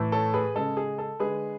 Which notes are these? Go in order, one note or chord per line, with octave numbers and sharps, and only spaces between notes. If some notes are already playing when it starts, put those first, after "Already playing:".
Already playing: A2 E3 A3
A4 C#5
G#4 B4
C#3 G#3 A4
G#4
A4
D3 G#3 G#4 B4